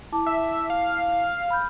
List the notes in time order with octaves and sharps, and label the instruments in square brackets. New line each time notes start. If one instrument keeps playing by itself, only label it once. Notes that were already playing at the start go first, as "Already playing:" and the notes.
[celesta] E4 A5 D6
[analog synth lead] E5
F5
[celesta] B5 F6 G6